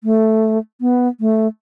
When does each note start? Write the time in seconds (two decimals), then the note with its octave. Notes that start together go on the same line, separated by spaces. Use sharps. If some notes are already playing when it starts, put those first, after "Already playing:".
0.04 A3
0.81 B3
1.20 A3